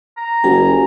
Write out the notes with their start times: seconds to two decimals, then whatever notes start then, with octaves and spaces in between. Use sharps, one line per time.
0.17 A#5
0.44 F#1 F#4 G4 G#5